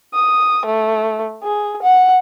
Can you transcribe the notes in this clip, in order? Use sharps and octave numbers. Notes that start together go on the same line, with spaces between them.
D#6
A3
G#4
F#5